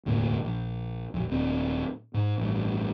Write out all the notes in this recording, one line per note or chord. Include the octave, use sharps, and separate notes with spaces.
E1 D2 A2 A#3
A#1
A#1 F2
D#1 D#2 D#3 C4
G#2
A1 G2